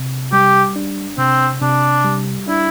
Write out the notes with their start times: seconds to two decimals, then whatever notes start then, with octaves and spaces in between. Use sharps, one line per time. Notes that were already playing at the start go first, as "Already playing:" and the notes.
Already playing: C3
0.32 G3 G4
0.76 D4
1.18 C3 C4
1.61 C3 D4
2.05 G3
2.48 D4 E4